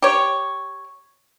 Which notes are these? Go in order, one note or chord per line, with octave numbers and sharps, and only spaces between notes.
G4 C#5